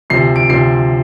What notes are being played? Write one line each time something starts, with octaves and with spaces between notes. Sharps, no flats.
D2 C3 F3 C7
D7
D2 C3 F3 C7